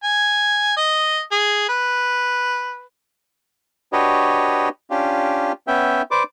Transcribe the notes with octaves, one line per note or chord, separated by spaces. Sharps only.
G#5
D#5
G#4
B4
D4 F#4 G4 B4 C#5 D#5
C#4 D4 F4 G4
B3 C#4 E5 G5
B4 C5 D5 D6